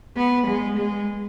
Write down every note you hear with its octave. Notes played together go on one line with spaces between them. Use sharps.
B3
G#3
G#3